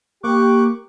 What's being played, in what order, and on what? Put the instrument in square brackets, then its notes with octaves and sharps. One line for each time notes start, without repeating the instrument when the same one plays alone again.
[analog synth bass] A#3 [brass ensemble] G4 [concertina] C#6 D6 F#6